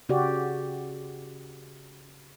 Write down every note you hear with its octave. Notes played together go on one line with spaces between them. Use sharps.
C#3 F#4 G4 D5